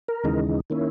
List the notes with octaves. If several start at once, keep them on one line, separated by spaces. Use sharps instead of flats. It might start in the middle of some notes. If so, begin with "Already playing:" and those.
A#4
D#2 C#3 E3 G#3 D#4
D#3 A#3 C#4 E4